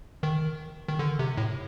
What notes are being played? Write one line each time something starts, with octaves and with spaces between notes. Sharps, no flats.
D#3
D#3
D3
C3
A2